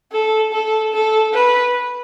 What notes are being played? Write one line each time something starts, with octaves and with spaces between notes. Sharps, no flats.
A4
A4
A4
B4